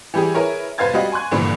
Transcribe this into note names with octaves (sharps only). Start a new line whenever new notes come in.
E3 G3 G4 G#4
E4 G#4 A#4 B4 C#5
F1 B4 C5 F5 G#6 A6
G3 C4 F#4 D#5 F5
G#5 C6 C#6 F#6 G#6
G#1 G2 A#2 D3 E3 F3